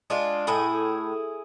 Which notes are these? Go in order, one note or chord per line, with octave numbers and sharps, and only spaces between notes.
G#3 D4 F4
A2 E4 G#4